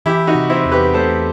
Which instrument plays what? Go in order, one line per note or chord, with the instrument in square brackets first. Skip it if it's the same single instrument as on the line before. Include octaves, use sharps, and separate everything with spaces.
[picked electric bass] E3 [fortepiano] E4 G4
[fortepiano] D#4 F#4
[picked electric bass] C3
[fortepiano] C4 E4
[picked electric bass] E2
[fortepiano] G4 B4
[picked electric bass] A3 [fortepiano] A4 C5